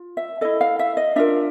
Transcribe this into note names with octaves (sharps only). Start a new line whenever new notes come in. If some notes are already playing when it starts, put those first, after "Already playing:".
Already playing: F4
E5
E4 A4 D#5
F5
E5
D#5
D4 F4 A#4 E5